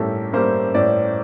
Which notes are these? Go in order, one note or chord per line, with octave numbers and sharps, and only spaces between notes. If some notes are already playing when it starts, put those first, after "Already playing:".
Already playing: A2 G3 A#3 G4 A4
G3 A#3 C5
A2 D5